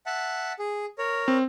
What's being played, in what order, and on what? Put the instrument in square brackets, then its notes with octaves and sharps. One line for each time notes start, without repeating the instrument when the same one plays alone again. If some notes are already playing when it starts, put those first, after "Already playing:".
[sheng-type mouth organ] E5 F#5 A5
G#4
A#4 C#5
[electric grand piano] C4